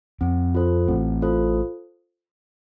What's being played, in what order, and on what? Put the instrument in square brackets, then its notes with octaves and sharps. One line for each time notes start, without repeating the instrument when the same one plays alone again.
[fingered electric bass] F2 [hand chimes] C4
[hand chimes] F4 A4 C5
[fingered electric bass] A1 A2 [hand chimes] C4
[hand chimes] F4 A4 C5